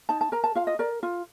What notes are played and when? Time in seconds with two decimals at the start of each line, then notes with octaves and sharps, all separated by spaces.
0.09 D#4 A5
0.21 A5
0.32 A#4 A#5
0.44 A5
0.55 F4 F5
0.67 D#5
0.79 A#4 D5
1.03 F4